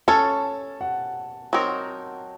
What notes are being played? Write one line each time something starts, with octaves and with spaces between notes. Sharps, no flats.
C#4 A4 C#5 A5
F#5
F#3 C4 D#4 A#4